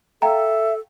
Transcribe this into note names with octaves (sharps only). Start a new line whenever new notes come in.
A4 E5 F5 G5 A#5